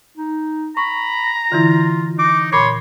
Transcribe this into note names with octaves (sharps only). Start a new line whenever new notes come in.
D#4
A#5 B5 C#6
D3 E3 E4 F4
D#4 D6
A#2 C#5 B5 C6 D6